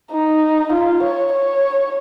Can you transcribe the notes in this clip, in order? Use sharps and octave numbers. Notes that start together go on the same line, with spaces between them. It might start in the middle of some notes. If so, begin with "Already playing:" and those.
D#4
F4
C#5
C#5